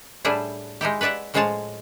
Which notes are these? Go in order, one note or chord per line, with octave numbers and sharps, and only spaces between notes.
A2 G3 D4 E4 G#4
G#3 D#4 E4 G4
B4 C#5 D5 E5 F#5
A2 F3 G#3 G#4 C#5 A5